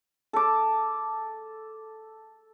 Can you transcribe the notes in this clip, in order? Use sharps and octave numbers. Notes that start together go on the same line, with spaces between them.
A4 D6